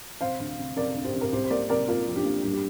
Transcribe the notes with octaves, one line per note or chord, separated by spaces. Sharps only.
C3 C5 F5
D2
C3
C3 A#4 D5
D2
G4 C5
C3
A#4
C2 G4 C5
C5
A#3 A#4 D5
C3 A#4 D5
A#3 F4 A#4
F3
D4 G4
A#3
G3 D4
G4